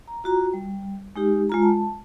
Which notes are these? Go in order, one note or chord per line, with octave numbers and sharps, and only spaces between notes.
A#5
F4 F#4 A#5
G3
G#3 D#4 G4
G#3 F4 A#5
A5